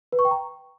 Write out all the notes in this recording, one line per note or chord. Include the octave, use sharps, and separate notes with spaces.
B4
C#6
G5
A#5